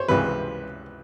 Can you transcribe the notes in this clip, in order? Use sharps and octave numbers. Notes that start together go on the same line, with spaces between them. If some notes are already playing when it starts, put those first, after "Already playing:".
Already playing: C5 C#5
C#2 C3 E3 B4